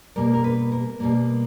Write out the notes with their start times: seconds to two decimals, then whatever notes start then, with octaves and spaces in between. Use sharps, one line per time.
0.16 B2 G3 A#3 A#4
0.34 A#4
0.44 B4
0.72 A#4
1.00 B2 G3 A#3